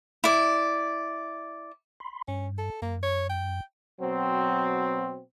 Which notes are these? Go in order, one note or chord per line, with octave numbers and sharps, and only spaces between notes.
E4 D5
B5 C6
G2 C#4
A4
F#2 A#3
C#5
G5
B2 F#3 C4